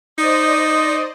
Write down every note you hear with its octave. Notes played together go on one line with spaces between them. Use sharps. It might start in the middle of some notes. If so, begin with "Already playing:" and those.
D#4 C5 D5 D#5 D#6